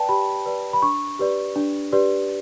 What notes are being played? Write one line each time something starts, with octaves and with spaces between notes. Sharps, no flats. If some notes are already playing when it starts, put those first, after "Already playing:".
Already playing: B4 D5 G5 A5
G4 B5
B4 D5
B5
D4 C#6
G4 B4 D5
D4
G4 B4 D5